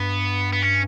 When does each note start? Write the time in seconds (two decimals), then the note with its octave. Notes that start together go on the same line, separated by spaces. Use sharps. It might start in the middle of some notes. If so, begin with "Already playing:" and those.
Already playing: G2 B3
0.53 B3
0.62 C#4